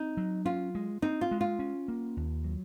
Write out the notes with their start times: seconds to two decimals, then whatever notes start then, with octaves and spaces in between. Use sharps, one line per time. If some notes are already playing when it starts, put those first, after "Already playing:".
Already playing: C4 D#4
0.17 F#3
0.45 C#4 F4
0.75 G#3
1.02 C4 D#4
1.21 F4
1.31 G#3
1.41 F4
1.59 C#4
1.88 A#3
2.17 D#2
2.44 F#3